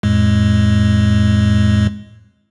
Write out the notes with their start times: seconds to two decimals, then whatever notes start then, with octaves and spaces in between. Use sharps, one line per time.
0.03 F2 A2 G#3